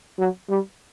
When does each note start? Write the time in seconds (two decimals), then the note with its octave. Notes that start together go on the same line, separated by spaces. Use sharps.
0.18 F#3
0.49 G3